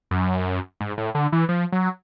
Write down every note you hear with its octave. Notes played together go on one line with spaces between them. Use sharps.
F#2
G#2
A2
D3
E3
F3
F#3